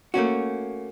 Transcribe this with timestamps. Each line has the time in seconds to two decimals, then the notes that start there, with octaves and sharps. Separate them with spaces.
0.14 A3 A#3 C#4 F#4